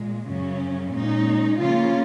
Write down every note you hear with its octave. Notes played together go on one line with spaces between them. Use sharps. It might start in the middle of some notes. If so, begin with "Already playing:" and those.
Already playing: A#2 G#3
F#2 C#3 F#3 C#4
A#2 G#3 C#4 D#4
C#3 F3 A#3 C#4 F4